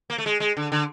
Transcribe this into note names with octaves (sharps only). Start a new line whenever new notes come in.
A#3
A3
G#3
G#3
D3
D3